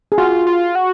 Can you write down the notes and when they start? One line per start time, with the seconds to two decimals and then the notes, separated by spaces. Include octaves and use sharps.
0.12 G#4
0.18 F4 F#4
0.47 F4
0.75 F#4